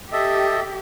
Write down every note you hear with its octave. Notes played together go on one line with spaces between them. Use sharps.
G4 A4 D#5 E5